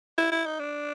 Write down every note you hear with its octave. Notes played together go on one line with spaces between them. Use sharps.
E4
E4
D#4
D4